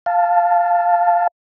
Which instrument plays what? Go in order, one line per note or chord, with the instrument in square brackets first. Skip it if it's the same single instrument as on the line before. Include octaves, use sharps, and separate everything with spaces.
[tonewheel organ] F5 A5